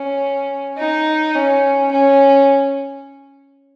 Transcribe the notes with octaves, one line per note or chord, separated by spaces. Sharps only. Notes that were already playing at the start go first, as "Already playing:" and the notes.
Already playing: C#4
D#4
C#4
C#4